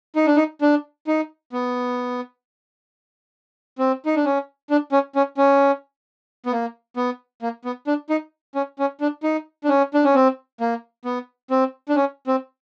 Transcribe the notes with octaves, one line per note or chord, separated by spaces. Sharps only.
D#4
D4
D#4
D4
D#4
B3
C4
D#4
D4
C#4
D4
C#4
C#4
C#4
B3
A#3
B3
A#3
B3
D4
D#4
C#4
C#4
D4
D#4
D4
C#4
D4
C#4
C4
A#3
B3
C4
D4
C#4
C4